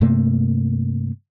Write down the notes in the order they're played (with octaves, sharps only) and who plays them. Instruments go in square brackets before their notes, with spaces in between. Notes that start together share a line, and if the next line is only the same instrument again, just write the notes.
[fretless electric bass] G2 C3 A3 A#3